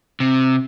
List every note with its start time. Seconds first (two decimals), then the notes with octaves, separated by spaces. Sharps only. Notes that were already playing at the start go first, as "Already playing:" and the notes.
0.20 C3